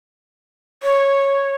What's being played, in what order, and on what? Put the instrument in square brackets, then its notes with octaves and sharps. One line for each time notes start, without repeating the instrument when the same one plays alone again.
[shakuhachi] C#5